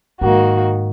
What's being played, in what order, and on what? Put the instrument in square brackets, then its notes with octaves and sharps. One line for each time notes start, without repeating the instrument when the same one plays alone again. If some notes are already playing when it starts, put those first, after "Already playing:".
[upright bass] G#2 [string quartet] D#3 A#3 F#4